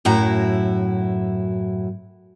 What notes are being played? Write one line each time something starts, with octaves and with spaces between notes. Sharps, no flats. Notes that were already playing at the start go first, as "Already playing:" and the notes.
F#2 A2 E4 F#4 A#5